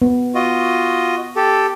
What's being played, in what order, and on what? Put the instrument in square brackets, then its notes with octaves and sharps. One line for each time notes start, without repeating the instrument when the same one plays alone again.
[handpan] B3
[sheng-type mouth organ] F4 F#4 D#5
G4 A4